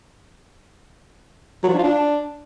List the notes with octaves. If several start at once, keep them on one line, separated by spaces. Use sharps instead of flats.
F#3
F3
D4
F4
D4